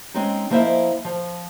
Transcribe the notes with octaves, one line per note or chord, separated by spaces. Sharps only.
G#3 C4 C#4 D#4
F3 A#3 E4 C5 D#5 E5
F3